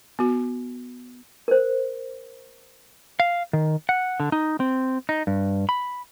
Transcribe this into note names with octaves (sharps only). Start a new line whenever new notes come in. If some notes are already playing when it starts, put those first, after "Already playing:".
B3 F#4
A#4 C5
F5
D#3
F#5
D3
D#4
C4
D#4
G2
B5